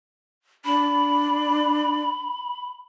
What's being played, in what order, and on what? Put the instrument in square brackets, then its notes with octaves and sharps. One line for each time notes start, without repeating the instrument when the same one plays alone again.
[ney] D4 [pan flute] B5